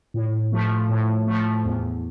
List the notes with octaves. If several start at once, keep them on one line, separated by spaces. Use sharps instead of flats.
A2
F3 A3
A2
F3 A3
E2